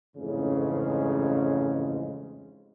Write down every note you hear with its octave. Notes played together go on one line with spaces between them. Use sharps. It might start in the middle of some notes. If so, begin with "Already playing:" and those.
A1 F2 G#2 C#3 G#3